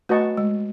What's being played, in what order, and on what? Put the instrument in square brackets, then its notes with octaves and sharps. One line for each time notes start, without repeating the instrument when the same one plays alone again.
[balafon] A3 [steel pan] F#4 B4 D#5 A5 C#6
[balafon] G#3